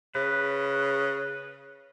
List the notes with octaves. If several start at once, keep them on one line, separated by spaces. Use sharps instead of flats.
C#3 B4